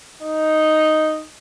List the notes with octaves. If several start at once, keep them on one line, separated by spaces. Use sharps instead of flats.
D#4